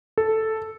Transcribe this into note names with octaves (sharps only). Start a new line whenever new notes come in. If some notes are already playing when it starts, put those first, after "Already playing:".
A4